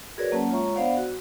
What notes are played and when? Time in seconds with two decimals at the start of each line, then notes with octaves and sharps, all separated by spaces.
0.18 F#4 G#4 A#4 B4 C#5 D5
0.31 F#3 A#3 C#4 F#5 A5
0.50 G#3 F4 C#5 E5 A#5 C#6
0.76 B3 D4 C5 D5 F5 F#5
0.97 F#4